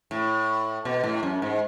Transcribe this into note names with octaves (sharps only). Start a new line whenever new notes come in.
A2
B2
A2
F#2
G#2